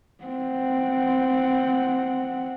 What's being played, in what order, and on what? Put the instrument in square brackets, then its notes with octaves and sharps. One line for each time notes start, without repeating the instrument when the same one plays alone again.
[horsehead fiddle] C4 F#5